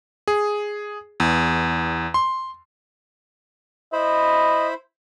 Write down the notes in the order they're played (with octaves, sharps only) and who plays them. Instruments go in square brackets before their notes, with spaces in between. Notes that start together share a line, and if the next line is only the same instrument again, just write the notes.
[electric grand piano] G#4
E2
C6
[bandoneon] E4 C5 B5 [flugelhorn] D#5